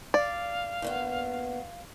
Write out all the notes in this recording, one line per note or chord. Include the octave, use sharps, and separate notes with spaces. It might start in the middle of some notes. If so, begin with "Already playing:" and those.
D5 F5
G2 A#3 B3